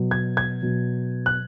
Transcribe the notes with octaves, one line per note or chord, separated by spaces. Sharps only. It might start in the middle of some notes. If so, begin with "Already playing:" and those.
Already playing: B2 F#3
G#6
G#6
B2 F#3
F#6